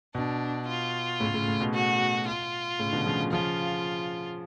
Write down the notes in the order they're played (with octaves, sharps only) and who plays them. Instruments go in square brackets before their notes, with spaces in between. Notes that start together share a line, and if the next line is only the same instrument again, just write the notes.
[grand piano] B2 [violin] D4
[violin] F4
[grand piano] A2 C#3
A2 C#3
A2
B2
[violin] F#4
F4
[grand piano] A2 C#3
B2 D3
C#3 F3
[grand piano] C#3 F3 [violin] F4